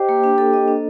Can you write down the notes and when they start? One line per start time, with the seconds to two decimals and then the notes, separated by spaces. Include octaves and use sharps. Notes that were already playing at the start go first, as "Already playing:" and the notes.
Already playing: G4 C5 D#5
0.09 A#3
0.24 D4
0.38 A4
0.53 D#5
0.68 D4